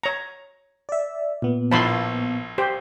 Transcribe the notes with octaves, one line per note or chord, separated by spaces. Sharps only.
C#5 A#5
D5 E5
A#2 B3
A#1 A2 F3 A5 B5 C6
G4 C5